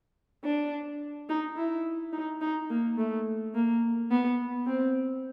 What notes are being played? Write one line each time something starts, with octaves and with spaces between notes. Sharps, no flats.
D4
D#4
E4
D#4
D#4
A#3
A3
A#3
B3
C4